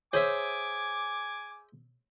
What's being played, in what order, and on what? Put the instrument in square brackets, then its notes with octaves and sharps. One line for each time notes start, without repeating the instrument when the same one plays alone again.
[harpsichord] G#4 C5 E5 [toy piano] C#5 [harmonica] G#5 D6